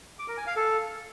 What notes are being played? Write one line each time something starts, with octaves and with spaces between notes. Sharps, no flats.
D6
A#4
G#5
F5
A4